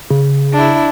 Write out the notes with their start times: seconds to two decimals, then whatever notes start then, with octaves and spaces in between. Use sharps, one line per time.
0.10 C#3
0.53 D4 E4